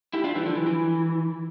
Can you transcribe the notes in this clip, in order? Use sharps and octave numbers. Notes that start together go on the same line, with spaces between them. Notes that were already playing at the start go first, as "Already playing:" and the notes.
E4 G4
D4 F4
E3 G3
D3 F3
E3
E3